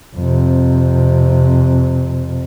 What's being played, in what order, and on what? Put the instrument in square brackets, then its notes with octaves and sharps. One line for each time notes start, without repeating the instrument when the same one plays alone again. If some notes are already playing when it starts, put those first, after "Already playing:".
[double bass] F2 C3